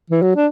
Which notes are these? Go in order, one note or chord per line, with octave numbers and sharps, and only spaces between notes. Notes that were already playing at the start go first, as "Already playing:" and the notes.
E3
F#3
D4